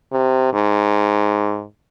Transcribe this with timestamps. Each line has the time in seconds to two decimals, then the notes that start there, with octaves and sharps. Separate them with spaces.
0.13 C3
0.54 G#2